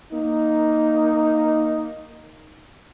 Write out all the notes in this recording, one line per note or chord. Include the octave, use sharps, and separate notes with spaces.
A#3 D#4